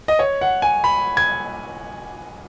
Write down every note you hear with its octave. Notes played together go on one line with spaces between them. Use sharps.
D#5
C#5
F#5
G#5
B5
G#6